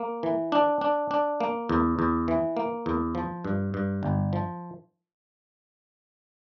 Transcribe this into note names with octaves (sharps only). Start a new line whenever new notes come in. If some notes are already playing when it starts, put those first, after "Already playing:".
Already playing: A#3
E3
D4
D4
D4
A#3
E2
E2
E3
A#3
E2
F3
G2
G2
G1
F3